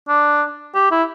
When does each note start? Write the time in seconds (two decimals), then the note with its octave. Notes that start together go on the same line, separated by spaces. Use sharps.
0.08 D4
0.75 G4
0.91 E4